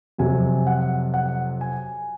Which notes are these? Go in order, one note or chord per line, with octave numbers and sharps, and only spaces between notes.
F2 C3 F#3 G#5
F#5
F#5
G#5